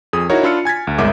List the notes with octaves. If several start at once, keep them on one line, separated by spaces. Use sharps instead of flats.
F2 G#4 D#6
D#4 E4 F#4 A#4 C#5
D4 F4 B5 E6 F6 C#7
G#5 G#6 A6 B6
D2
G1 C2 G#3 A#4 E5 D6